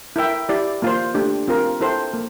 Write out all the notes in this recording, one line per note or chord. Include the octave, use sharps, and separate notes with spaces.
E4 A#4 E5 G5
E4 G4 D5
A#3 F4 C5
A3 D4 G4
C4 F4 A#4
E4 A4 C5 G5
A#3